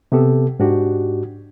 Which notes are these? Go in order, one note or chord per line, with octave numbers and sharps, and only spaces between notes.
C3 B3 G4 A4
G#2 D4 F#4 G4